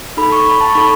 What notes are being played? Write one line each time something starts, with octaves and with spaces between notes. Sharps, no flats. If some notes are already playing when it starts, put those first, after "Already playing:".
D#4 A4 B5
C#6
B5
A5
C#6
D#4 A4 B5